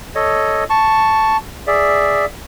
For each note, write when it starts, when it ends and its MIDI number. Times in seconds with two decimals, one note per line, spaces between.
0.15 0.64 69
0.15 0.64 73
0.15 0.64 75
0.70 1.37 81
0.70 1.37 85
1.67 2.25 68
1.67 2.25 74
1.67 2.25 76